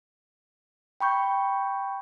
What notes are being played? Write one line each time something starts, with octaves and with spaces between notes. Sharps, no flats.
G5 B5 C#6 G6